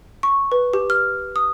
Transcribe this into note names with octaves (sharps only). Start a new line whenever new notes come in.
C#6
B4
G4
F6
D#6